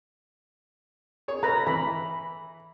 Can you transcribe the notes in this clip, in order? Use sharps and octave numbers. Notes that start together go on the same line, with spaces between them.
G#4 C#5
A4 B4 A#5 B5
E3 B5